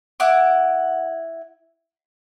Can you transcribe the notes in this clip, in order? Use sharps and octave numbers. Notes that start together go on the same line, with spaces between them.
E4 F#5 D6